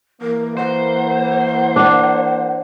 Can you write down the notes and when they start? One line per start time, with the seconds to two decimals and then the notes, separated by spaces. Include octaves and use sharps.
0.22 E3 A#3 A#4
0.57 C5 F#5
1.76 D4